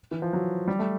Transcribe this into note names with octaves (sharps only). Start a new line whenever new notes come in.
E3
F3
F#3
G3
A3